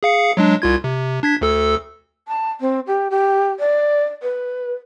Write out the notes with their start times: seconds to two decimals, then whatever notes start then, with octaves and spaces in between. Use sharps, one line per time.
0.03 G#4 F5 C#7
0.37 F#3 G#3 D4
0.62 C2 F4 G#6
0.84 C3
1.23 D4 G#6 B6
1.41 D2 A4 E6
2.28 A5
2.61 C4
2.87 G4
3.11 G4
3.60 D5
4.22 B4